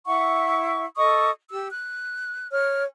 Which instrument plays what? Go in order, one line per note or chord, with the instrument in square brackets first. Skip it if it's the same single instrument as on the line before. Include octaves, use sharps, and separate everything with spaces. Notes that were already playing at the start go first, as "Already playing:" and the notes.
[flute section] E4 E5 F#5 C#6
A4 D#5 C#6 D#6
G4 E6
F#6
C#5 F6